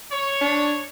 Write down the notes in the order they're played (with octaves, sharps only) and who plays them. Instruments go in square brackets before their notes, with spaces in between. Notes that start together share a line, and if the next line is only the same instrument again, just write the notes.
[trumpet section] C#5
[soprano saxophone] D4